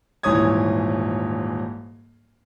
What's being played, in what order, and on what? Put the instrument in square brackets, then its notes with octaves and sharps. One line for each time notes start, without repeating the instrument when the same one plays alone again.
[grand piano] D#1 G#2 E3 C#5 D#6 G#6